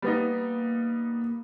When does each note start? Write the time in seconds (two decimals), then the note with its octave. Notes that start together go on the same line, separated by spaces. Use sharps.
0.02 G3 A#3 B3 D#4